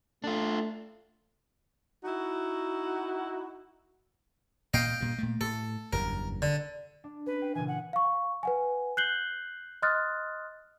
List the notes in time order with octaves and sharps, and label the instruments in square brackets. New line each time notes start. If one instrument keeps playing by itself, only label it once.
[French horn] A3 [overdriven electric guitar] D4 F4
[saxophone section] D#4 E4 F#4
[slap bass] A#2 [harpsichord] D#5 F5 G5
[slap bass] G2 A#2
A#2 A3
[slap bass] A2 [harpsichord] A4
[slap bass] F#1 E2 G2 [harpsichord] A#4
[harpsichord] D3
[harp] D4
[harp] C#4 [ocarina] B4
[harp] G5 C7
[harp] A#2 C#3 E3 [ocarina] G#5
[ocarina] F#5
[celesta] F5 C#6
B4 F#5 G#5
F#6 G6 C7 F#7 G7
D#5 C6 D#6 F6 F#6 A6